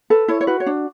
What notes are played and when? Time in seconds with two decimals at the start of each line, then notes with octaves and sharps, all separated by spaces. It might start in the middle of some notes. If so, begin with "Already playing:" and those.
0.10 A4 B4
0.28 E4 C#5
0.41 C#5
0.47 F#4 B4
0.60 C#5
0.66 D4